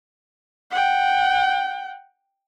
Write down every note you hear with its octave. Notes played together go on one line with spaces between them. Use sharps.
F#5 G5